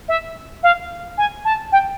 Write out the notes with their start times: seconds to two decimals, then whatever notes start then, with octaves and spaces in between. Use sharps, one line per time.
0.09 E5
0.63 F5
1.18 G#5
1.45 A5
1.72 G5